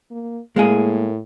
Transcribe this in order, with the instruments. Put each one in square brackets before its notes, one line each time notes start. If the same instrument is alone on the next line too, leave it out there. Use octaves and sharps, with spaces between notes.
[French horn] A#3
[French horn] A2 [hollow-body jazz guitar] G#3 A#3 G#4